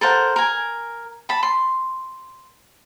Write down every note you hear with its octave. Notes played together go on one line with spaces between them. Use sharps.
A4 A#4 C5 F#5
A#4 G#5
A5 B5
C6